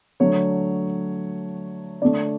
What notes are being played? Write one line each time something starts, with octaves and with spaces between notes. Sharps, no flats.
D3 F#3 A3 C#5
D3 A3 D5